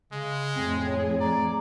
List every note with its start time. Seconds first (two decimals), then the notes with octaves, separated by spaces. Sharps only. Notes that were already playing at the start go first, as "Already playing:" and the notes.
0.13 C#3 G#3
0.56 F2 A2 C4 G#4
0.87 C4 C#5
1.20 D5 A#5